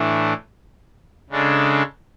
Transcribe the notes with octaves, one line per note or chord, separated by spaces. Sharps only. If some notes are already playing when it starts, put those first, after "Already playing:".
Already playing: A2 E3 A3 D4
C#3 G#3 D4 A4